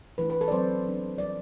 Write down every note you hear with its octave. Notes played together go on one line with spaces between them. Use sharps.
E3 A3 D4 B4
B4
A4
D5
F#3 A3 C4 C5
F#3 B3 D4
E3 G3 C4 D5